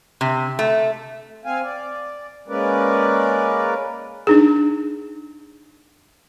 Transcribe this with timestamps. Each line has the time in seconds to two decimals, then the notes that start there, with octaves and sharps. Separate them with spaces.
0.21 C3
0.59 A3
1.45 C4 F5 G#5
1.62 D5
2.48 G#3 A#3 C#4 A#4 B4 D5
4.27 D4 D#4 G#4